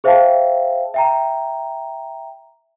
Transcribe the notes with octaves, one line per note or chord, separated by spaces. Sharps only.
G#4 C5 E5 F5 G5 A5
E5 G5 A#5